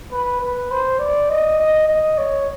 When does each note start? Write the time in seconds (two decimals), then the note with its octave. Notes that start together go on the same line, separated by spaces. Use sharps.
0.12 B4
0.41 B4
0.71 C5
0.99 D5
1.29 D#5
1.59 D#5
1.87 D#5
2.18 C#5